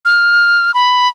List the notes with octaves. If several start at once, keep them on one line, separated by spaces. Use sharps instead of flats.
F6
B5